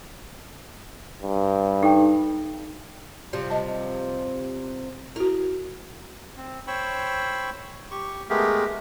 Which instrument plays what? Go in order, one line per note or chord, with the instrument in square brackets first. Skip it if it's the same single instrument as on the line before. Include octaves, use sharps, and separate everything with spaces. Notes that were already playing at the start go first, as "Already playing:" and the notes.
[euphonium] G2
[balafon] D#4 [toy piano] A4 G5
[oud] C3 F3 G3
[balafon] D#5 A5
[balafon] E4 F#4 [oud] A#4
[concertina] C4
C5 C#5 G5 B5 C#6 E6
G4 C#6
G#3 A3 B3 G4 G#4 A#4